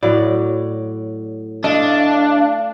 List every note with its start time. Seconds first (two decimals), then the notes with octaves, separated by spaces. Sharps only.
0.03 A2 F#3 D5
1.64 A3 D4 D#5 F5